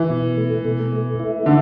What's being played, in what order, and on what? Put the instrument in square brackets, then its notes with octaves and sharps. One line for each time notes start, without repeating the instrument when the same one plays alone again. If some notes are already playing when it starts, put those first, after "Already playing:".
Already playing: [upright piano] E3
[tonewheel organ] B2
A3
B2
A3
E4
[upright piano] D3